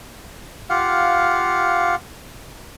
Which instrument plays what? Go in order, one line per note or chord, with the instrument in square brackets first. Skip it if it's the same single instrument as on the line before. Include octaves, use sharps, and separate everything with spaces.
[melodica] F4 G4 F5 F#5